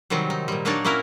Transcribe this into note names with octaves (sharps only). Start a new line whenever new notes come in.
C3 D#3 F#3 G3 C4
D#4
A#2 G3
F#3 A#3 D4 D#4 C#5 D5
A#3 C#4 E4 F#4 A#4